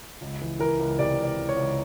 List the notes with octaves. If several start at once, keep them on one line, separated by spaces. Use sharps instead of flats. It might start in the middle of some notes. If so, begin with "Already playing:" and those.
C#2
E3
E3 A#4
C#2
C3 D5
C#2
D5
C#2
C#5
C#2